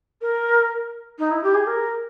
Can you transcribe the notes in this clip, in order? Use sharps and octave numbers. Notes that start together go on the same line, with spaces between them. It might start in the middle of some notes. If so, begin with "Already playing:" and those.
A#4
D#4
E4
G4
G#4
A#4